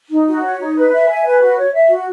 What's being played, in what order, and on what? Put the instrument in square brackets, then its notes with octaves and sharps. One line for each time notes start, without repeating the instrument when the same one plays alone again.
[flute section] D#4
F#4
C#5
D#4
B4
E5
G#5
B4
F#4
C#5
E5
F#4